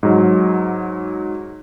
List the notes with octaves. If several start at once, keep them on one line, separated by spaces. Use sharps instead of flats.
G#2 F#3